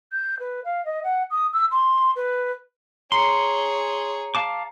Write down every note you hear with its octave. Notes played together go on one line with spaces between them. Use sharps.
G6
B4
F5
D#5
F#5
D#6
E6
C6
B4
G#4 C#5 A#5 C6 C7 C#7
F5 A5 D6